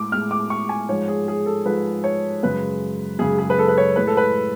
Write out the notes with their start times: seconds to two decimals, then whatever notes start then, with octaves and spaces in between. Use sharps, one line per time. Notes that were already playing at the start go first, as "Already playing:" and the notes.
Already playing: A2 G#3 D6
0.12 A2 G#3 F6
0.31 D6
0.50 C#6
0.69 G#5
0.89 G#2 F3 G#3 C#5
1.08 G#4
1.28 G#4
1.46 A4
1.65 G#2 F3 G#3 B4
2.04 C#5
2.43 F#2 C#3 G#3 B4
3.19 F#2 C#3 G#3 G#4
3.38 G#4
3.50 B4
3.58 A4
3.68 B4
3.78 C#5
3.96 A2 G#3 B4
4.07 A4
4.17 B4